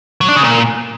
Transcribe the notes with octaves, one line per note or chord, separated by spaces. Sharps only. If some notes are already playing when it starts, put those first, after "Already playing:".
F#3
D4
C#3
A#2